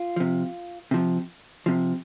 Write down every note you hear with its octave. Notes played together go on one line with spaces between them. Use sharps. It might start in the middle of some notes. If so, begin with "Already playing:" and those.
Already playing: F4
C3 F3
C3 F3
C3 F3